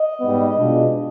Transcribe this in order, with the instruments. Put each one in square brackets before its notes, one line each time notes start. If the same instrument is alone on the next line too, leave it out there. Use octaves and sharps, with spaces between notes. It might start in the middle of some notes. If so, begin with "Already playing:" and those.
Already playing: [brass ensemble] D#5
G#2 G3 B3
B2 G#3 D4 F4